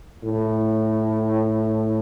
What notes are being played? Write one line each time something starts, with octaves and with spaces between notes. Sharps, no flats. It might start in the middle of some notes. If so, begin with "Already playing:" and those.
A2